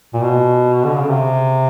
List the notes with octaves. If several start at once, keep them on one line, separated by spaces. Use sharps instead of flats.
A#2
B2
D3
C#3
C3